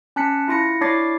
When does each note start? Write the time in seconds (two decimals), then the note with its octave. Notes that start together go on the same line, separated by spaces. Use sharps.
0.16 C#4 A5 F#6 B6 C#7
0.48 E4 F4 A#6 C#7
0.81 D4 E4 C#5 D6 A6 C7